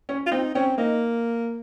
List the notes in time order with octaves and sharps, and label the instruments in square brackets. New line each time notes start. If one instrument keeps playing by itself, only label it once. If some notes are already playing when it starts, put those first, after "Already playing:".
[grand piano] C#4
[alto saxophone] F4
[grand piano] C4 [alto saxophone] D#4
[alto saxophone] C4 [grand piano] C#4
[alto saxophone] A#3 [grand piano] D#4